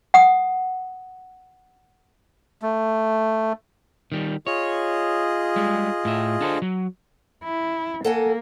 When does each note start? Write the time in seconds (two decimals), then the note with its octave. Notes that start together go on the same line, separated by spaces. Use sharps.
0.14 F#5 D#6
2.62 A3
4.12 D#3 G3
4.47 F4 G#4 C#5 D#5
5.56 G3 G#3
6.05 A2 E5
6.41 D4 A4 C5
6.62 F#3
7.44 E4
8.05 A#3 A4 F#5 G#5